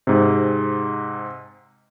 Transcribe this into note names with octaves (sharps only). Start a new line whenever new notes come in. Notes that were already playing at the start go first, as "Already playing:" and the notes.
G#2 C3